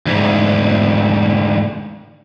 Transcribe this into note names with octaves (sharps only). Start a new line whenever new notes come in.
D2 G#2